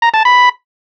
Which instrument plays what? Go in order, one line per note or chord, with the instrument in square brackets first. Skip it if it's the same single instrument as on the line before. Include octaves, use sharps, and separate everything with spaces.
[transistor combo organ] A#5
A5
B5